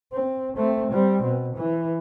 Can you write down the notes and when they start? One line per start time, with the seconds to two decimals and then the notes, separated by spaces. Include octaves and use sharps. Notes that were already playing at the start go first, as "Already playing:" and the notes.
0.13 C4
0.57 A3 C4
0.91 G3 C4
1.23 B2
1.56 E3